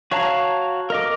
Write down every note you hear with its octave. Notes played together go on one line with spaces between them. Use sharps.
F#4 C#5 F5 A5 A#5
A#4 D#5 D6